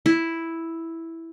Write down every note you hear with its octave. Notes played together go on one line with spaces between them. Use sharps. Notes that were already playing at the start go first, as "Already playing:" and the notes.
E4